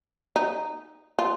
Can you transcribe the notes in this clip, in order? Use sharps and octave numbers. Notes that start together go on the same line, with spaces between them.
D#4
F4